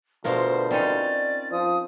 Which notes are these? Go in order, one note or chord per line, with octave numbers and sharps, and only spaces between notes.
D2 B2 F4 A#4 C5
C4 C#4 D#4 D5
F3 D#6